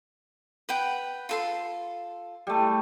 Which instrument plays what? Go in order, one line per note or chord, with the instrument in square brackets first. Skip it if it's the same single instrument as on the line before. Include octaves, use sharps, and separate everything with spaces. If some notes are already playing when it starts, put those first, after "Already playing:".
[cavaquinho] B4 F#5 G5
F4 A4 C6
[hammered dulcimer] G3 A3